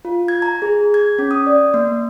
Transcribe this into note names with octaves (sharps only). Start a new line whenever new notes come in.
F4
G#6
A#5
G#4
G#6
C#4
D#6
D5
A#3